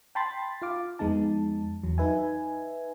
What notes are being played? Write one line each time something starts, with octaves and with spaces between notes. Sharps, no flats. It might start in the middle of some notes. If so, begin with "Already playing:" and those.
G5 A5 B5 C6 A6
F4 F5 D6
F2 G#3 B3 D#4 A5
E2 F#3
D#4 B4 E5 G#5